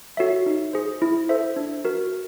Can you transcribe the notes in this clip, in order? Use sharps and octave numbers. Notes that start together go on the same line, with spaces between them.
F#4 A4 C#5 E5
D#4
G#4 C5
E4
A4 C5 E5
D4
F#4 A#4